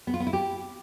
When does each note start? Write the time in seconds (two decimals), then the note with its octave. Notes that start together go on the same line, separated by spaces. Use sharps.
0.07 B3
0.14 F4
0.20 B3
0.27 E4
0.33 G4